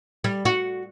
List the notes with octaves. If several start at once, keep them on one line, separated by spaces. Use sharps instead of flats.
G3
F#4